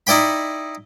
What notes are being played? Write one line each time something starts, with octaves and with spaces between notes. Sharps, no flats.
D#4 E4 D5 G5 B5